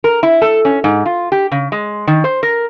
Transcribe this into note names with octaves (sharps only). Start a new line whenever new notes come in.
A#4
E4
A4
C#4
G#2
F4
G4
C#3
G#3
D#3
C5
A#4